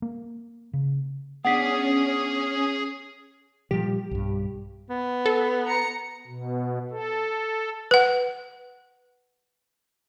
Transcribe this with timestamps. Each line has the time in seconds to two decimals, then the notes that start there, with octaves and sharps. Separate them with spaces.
0.02 A#3
0.73 C#3
1.45 B3 C#4 D4 G#4 F#5 B6
3.71 A#2 F3 G3 G4
4.11 B1 G2
4.90 B3
5.26 A4
5.65 A#5 C#7
6.27 B2
6.91 A4
7.91 B4 F#5